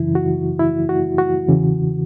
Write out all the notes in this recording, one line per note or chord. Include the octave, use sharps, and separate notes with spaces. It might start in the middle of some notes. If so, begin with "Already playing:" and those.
Already playing: F#2 C#3 E3 E4
F#4
E4
F#4
F#4
E2 C#3 E3